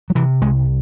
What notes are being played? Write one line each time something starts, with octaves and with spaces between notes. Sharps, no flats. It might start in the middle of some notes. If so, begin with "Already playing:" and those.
F#3
C3 E3
C2 G#3